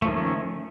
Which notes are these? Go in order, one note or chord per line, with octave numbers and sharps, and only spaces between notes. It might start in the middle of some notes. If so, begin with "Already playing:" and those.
D#3 F3 A3 C#4